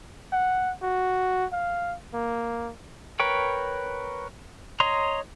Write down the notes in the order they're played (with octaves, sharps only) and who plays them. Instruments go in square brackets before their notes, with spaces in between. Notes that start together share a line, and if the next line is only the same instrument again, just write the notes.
[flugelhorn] F#5
F#4
F5
A#3
[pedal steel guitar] A#4 B4 C#5 G5
C#5 D#5 A#5 C6